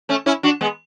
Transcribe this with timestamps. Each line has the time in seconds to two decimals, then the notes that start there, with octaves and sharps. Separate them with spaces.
0.09 A3 C#4
0.26 C#4 E4
0.43 D4 F#4
0.61 G#3 B3